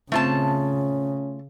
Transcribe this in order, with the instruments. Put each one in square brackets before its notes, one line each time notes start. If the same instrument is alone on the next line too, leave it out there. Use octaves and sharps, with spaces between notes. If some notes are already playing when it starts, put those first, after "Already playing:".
[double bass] C#3 [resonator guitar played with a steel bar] A3 F4 A5 [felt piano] C4 [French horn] C#4